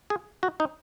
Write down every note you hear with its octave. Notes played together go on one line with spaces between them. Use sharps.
G#4
F#4
D#4